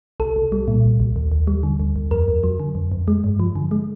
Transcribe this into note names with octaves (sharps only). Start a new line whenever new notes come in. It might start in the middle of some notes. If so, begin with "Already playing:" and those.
C2 A4
C2
G3
A#2
C2
C2
D#2
D#2
G3
D3
D#2
D#2
F2 A#4
F2
F#3
D3
F2
F2
G#3
G2
F3
D3
G#3